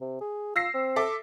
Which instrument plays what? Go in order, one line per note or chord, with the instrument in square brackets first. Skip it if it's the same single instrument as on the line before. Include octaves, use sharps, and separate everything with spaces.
[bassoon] C3
G#4
[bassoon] F4 [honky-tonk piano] E6 A#6 C7
[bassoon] C4
[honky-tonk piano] A4 E5 D6